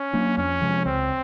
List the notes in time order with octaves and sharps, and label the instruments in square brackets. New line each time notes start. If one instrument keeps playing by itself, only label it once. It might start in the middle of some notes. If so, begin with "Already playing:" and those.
Already playing: [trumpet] C#4
[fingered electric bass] F#3 A#3 D4
[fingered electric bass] F2 [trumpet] C#4
[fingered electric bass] C3 F3 G#3
[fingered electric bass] C#2 [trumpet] C4